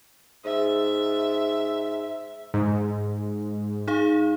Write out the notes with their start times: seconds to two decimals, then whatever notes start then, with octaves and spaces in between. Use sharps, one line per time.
0.45 G#2 E5
2.54 G#2
3.88 D#4 G#4 F5